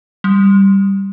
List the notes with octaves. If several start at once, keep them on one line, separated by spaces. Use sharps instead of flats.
G3